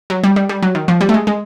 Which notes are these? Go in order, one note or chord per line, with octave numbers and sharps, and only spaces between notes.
F#3
G3
G3
G3
F#3
D#3
F3
G3
A3
G#3
G#3